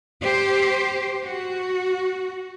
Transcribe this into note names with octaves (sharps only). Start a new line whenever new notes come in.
G4 C5
F#4